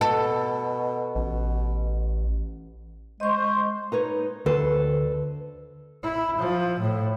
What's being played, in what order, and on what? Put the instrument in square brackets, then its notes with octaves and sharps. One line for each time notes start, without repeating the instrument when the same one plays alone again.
[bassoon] B2 [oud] A4
[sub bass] A1 [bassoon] B2
[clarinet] G#3 [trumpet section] C5 [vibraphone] D#5 C#6
[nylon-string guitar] D#4 B4 C#5
[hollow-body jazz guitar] D2 [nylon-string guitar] A4 B4 C5
[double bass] E4
F3
A2